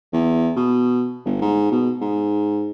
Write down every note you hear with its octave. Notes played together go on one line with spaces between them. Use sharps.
E2
B2
G1
G#2
B2
G#2